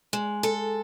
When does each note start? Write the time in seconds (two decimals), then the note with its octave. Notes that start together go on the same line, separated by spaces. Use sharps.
0.13 G#3
0.43 A4